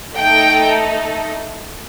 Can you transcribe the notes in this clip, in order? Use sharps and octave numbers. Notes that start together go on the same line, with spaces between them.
A3 D#4 A4 G5